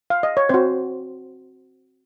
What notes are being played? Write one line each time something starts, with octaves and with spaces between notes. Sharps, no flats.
F5
D#5
C#5
C4 F#4 C5